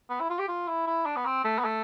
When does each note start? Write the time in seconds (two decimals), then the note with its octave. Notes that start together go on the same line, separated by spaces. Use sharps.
0.10 B3
0.20 E4
0.30 F4
0.39 G4
0.49 F4
0.68 E4
0.87 E4
1.06 D4
1.16 B3
1.25 C4
1.44 A3
1.59 B3
1.64 A3